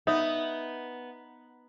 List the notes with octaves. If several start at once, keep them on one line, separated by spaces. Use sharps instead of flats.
B3 D#4 E5